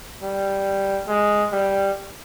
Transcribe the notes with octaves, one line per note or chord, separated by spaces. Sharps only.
G3
G#3
G3